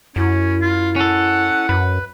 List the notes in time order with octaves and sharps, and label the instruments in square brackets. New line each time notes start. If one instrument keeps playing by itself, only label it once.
[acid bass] F#2 [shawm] C#4 [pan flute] E4
[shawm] F4
[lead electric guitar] C#4 A4 [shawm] F#5
[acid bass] F#2 [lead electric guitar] B4